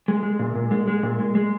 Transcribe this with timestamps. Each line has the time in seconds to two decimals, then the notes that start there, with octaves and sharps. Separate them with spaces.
0.08 G#3
0.23 G#3
0.39 A#2
0.55 A#2
0.71 G#3
0.88 G#3
1.03 A#2
1.19 G#3
1.35 G#3